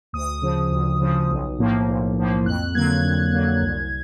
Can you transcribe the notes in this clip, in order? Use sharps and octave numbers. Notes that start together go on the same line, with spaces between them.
D2 D#6
C#3 F3
D2
C#3 F3
B1
A2 F3 A#3
B1
A2 F3 A#3
F2 F#6
D3 F#3 A#3 G#6
F2
D3 F#3 A#3
C2